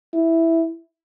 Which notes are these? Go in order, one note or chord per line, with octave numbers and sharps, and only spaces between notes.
E4